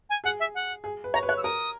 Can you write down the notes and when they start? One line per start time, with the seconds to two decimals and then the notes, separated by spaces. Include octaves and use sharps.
0.10 G#5
0.24 G#4 F#5
0.40 E5
0.55 F#5
0.84 G#4
1.04 B4
1.14 C#5 A#5
1.23 B4
1.28 C#5 F#6
1.37 E6
1.43 A#4 D#6